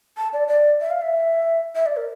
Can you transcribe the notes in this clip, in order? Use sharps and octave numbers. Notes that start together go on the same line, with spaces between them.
A5
D5
D5
E5
F5
E5
E5
D5
A#4